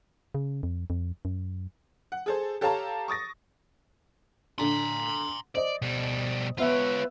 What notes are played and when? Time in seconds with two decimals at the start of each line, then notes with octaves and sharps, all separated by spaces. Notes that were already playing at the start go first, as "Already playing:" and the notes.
0.35 C#3
0.63 F2
0.90 F2
1.25 F#2
2.12 F#5
2.26 G#4 A4 C5
2.61 G4 A4 C#5 F5 A5 A#5
3.08 C#6 D#6 A6 A#6
4.58 D3 D4 A#5 C6
5.55 C5 D5 D#5
5.82 B2 G3
6.58 B3 F4 B4 C#5 E5